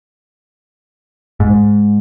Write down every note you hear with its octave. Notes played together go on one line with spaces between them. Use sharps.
G#2